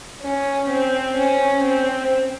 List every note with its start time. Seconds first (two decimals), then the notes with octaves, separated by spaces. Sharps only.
0.23 C#4
0.70 C4
1.17 C#4
1.64 C4